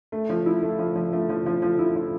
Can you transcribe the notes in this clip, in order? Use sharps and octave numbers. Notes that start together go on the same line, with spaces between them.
A3
F3
E4
A3
F3
F3
A3
F3
F3
F3
E4
F3